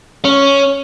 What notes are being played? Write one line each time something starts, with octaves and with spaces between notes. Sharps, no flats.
C#4